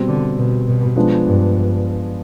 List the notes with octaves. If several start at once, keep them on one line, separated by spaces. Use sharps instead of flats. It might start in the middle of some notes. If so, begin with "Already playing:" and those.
Already playing: B2 G3 C4
D3
B2
B2
F3 G#3 B3 D4
G2